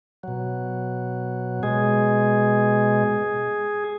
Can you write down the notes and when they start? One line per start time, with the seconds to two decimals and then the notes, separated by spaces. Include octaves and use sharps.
0.23 B2 F#3
1.63 B2 G#3 G#4